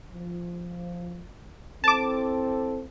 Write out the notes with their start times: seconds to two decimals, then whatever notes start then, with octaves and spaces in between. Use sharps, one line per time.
0.12 F3
1.84 C4 E4 A4 A5 D6